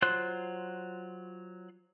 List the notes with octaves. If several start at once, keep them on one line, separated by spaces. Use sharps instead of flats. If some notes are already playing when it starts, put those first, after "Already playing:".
F#3 F4 C5 C6 F#6